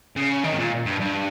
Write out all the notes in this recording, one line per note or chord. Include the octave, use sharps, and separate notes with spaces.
C#3
D#3
G#2
A#2
G2
G2